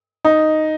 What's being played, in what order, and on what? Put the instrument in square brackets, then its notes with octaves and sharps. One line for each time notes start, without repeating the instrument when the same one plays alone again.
[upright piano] D#4